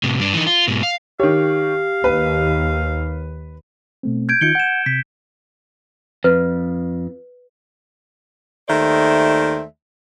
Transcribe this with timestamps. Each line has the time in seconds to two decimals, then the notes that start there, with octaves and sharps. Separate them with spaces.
0.03 A2 C3
0.19 G2 D4
0.33 E3 D#4
0.47 F4
0.68 G#2 B2
0.83 F5
1.20 D#3 G4 C#5 F5
2.04 D#2 B4
4.03 B2 A3 C4
4.29 G6 G#6 D7
4.41 D#3 D#4 F4 G6 C#7 G7
4.55 F#5 G6 E7
4.86 C3 B6
6.24 F2 B4
8.68 D#2 D#3 A3 C5 D5 E5